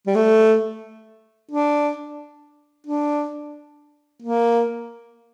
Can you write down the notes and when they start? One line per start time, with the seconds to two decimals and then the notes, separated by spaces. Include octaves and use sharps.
0.07 G3
0.16 A3
1.51 D4
2.87 D4
4.22 A#3